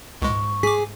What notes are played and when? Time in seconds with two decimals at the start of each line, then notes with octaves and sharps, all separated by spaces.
0.22 C#2 G#2 G#3 C#6
0.63 G#4 D6 B6